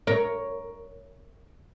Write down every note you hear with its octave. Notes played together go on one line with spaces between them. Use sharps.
A#4 C#5